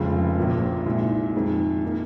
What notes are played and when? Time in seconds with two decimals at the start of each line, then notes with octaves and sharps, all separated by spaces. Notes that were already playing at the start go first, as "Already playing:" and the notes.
Already playing: F1 F2 C#3 F3 G#3
0.37 A#1 A#2 F3 A#3
0.85 C2 A#2 G#3 D#4
1.35 F2 D#3 G#3 D#4
1.84 D#3 A#3 D#4